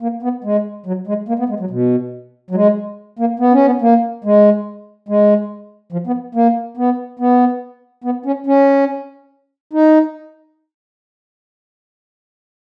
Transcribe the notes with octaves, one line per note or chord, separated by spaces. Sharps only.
A#3
B3
G#3
F#3
G#3
A#3
B3
G#3
F#3
B2
F#3
G#3
A#3
B3
C#4
B3
A#3
G#3
G#3
F3
B3
A#3
B3
B3
B3
C#4
C#4
D#4